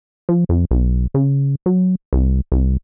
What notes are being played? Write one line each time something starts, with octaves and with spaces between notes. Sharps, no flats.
F3
F2
B1
C#3
F#3
C2
C2